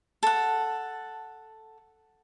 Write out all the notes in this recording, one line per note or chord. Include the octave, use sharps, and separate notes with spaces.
A4 F#5